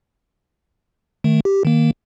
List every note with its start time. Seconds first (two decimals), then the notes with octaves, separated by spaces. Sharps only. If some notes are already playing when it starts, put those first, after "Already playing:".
1.24 D#3 A3
1.45 G4
1.65 D#3 A#3